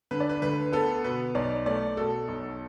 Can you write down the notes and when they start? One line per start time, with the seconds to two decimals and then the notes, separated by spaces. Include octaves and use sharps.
0.11 D3 B4
0.20 D5
0.29 B4
0.42 D2 B4
0.72 B3 A4
1.04 B2 B4
1.35 B1 D5
1.66 A3 D5
1.97 B2 A4
2.28 B1